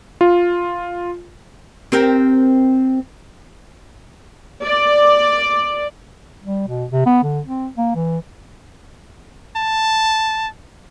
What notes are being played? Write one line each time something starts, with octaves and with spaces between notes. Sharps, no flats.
F4
C4 G4 A#4
D5
G3
B2
C3
B3
D3
C4
A#3
E3
A5